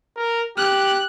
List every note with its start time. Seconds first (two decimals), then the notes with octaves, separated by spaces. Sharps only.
0.16 A#4
0.57 G4 F#6